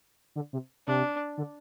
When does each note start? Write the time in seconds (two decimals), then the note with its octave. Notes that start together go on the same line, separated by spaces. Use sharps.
0.36 D3
0.53 C3
0.87 C3 D4
1.38 D3